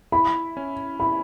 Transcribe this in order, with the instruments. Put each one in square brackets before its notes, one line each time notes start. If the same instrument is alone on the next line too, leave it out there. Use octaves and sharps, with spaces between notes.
[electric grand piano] E4 [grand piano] B5
[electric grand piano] C#4
[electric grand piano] E4 [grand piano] B5